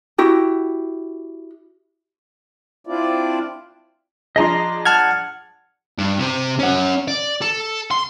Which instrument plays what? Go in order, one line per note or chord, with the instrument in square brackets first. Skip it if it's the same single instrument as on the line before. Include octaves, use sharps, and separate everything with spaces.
[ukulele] E4 F#4 G4
[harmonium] C4 D4 E4 F4 D5
[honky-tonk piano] F3 D4 G#4 [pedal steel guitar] D#5 A#5 C6
[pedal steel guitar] F#5 [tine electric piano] A5 F6 G#6
[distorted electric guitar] G2
C3 C5
C#4 F#5
D5
A4
C6